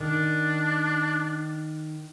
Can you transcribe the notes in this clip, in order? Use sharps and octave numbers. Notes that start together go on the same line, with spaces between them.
D#3 D4